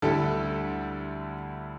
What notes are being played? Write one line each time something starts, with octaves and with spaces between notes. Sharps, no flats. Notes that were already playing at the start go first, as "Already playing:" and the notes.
D2 D3 G3 E4 A4